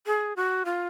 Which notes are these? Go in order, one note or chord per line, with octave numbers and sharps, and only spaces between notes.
G#4
F#4
F4